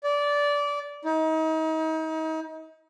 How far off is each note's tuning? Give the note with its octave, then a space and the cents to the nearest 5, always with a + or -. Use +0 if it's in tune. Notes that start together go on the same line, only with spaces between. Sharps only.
D5 -20
D#4 +35